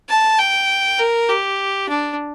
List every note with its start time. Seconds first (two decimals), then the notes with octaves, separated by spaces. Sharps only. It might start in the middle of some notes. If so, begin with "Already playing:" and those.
0.09 A5
0.39 G5
0.99 A#4
1.29 G4
1.89 D4